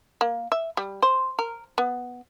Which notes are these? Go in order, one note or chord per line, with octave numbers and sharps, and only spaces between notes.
A#3
E5
G3
C5
A#4
B3